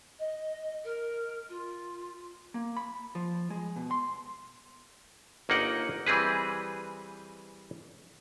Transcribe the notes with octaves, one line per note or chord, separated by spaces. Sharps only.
D#5
A#4
F4
A#3
B5
F3
G#3
B2
C6
G1 A#3 D#4 F#5 G5
E3 G3 C4 G#4 B4